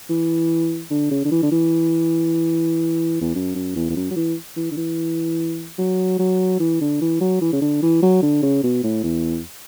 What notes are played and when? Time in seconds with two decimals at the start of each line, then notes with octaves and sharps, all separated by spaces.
0.09 E3
0.91 D3
1.11 C#3
1.25 D3
1.32 E3
1.43 D3
1.52 E3
3.21 E2
3.35 F#2
3.55 F#2
3.76 E2
3.90 E2
3.96 F#2
4.11 F#3
4.16 E3
4.56 E3
4.72 D3
4.77 E3
5.79 F#3
6.19 F#3
6.60 E3
6.81 D3
7.01 E3
7.21 F#3
7.41 E3
7.53 C#3
7.62 D3
7.82 E3
8.03 F#3
8.22 D3
8.43 C#3
8.63 B2
8.84 A2
9.04 E2